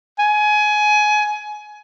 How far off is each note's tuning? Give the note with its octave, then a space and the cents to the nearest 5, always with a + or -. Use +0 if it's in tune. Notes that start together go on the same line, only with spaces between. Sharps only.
G#5 +20